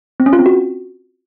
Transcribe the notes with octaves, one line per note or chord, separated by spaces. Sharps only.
C4
C#4
F4
C4
F#4